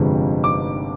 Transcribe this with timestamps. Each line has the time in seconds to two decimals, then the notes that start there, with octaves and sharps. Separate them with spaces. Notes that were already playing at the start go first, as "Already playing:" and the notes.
Already playing: G1 F2 C3 F3 G#3
0.44 D6